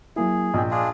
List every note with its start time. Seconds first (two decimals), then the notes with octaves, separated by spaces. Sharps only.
0.16 F#3 A#3 E4 G#4
0.54 A#1 D#5 G5
0.71 D4 F4 G#4